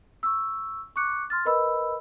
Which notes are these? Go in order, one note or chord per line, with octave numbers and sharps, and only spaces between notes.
C#6 E6
C#6 D6 F#6 C#7
C6 F6 A6
A#4 B4 D#5 B5 E6